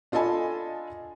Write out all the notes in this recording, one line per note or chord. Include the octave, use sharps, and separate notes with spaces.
D4 F4 A4 D#5 G#5 B5